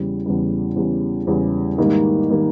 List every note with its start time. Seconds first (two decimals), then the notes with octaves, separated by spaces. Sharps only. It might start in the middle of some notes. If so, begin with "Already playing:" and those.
Already playing: E2 C#3 G3
0.26 E2 C#3 G3
0.76 E2 C#3 G3
1.27 E2 C#3 G3
1.78 G#2 D#3 G3 A#3
2.30 D#3 G3 A#3